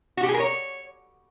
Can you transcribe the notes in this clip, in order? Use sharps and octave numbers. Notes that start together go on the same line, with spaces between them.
F#4
G4
G#4
A#4
C#5